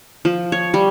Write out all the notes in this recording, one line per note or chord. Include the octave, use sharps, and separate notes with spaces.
F3
C#5
G3